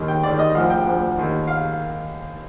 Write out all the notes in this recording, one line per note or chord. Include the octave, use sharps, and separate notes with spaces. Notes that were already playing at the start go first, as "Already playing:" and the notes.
Already playing: D#2 D#3
G5
D#2 D#3 D5
D#5
D2 D3 F3 F5
G5
D2 D3 F3
D#2 D#3
F5